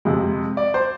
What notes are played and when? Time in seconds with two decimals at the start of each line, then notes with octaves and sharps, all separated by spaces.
0.05 F2 C3 G#3
0.57 D5
0.74 C5